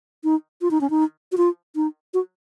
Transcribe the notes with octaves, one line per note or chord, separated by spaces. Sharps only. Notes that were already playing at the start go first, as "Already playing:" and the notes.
D#4
F4
D#4
C#4
D#4
F#4
F4
D#4
F#4